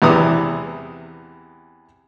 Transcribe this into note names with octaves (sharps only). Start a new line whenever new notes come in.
E2 C3 E3 A#5 D#6